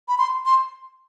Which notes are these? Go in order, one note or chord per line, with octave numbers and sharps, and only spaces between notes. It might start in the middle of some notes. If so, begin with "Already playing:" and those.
B5
C6
C6